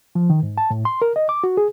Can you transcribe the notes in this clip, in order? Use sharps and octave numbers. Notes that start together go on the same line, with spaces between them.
F3
D#3
G#2
A5
A2
C6
A#4
D#5
D6
F#4
G#4